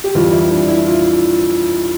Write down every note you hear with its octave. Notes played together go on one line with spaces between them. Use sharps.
G4
F2 E3 G3 F4
E4
D4
E4
F4